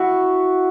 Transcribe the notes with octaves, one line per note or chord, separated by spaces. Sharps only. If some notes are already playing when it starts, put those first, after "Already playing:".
Already playing: E4 F#4